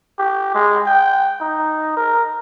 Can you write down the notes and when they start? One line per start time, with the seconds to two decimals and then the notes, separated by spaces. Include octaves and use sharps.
0.19 G4
0.54 G#3
0.86 G5
1.41 D#4
1.96 A#4